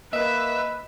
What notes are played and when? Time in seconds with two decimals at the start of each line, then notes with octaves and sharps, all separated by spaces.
0.13 A#3 B4 D#5 E5